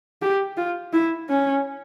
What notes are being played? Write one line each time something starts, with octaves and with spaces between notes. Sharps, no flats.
G4
F4
E4
C#4